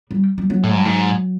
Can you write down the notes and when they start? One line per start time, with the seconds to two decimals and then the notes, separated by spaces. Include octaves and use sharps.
0.11 G3
0.38 G3
0.50 F#3
0.64 A2
0.71 G#2
0.77 G2
0.85 G#2